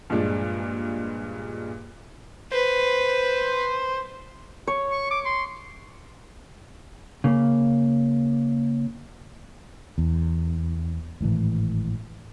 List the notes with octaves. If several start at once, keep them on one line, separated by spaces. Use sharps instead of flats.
G2 A#2 F3 G#3 D4
B4 C5
C#5
C#6
D6
C6
C#3 A#3
E2
G#1 A2 C#3 E3